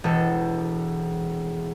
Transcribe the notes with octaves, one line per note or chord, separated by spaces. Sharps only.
E1 A4